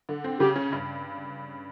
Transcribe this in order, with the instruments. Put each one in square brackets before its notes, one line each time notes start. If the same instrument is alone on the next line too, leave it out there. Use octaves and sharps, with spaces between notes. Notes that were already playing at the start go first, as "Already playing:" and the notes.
[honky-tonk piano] D3
C4
[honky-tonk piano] C#3 [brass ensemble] G4
[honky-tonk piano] C#4
G2